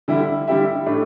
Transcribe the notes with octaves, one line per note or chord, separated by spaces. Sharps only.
D3 G3 E4 G4 E5
D3 G3 E4 G4 E5
A2 A3 D4